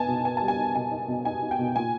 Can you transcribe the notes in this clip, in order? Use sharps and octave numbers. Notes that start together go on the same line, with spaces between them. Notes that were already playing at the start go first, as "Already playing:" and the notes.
Already playing: B3 D#4 G#5 A5
B2
B3 G#5
G3 A5
G#5
D#4
B2 G#5
D#4
B2
D#4 G#5
D#4
G5
B2
A#2 G#5